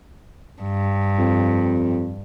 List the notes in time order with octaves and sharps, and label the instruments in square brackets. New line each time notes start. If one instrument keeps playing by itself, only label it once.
[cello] G2
[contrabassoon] F2